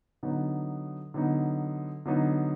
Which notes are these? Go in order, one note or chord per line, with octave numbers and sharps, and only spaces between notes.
D3 F#3 B3 D#4
D3 F#3 B3 D#4
D3 F#3 B3 D#4